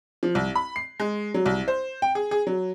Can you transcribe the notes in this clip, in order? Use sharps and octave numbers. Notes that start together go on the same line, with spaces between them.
F3
C2
B5
C7
G#3
F#3
C2
C5
G5
G#4
G#4
F#3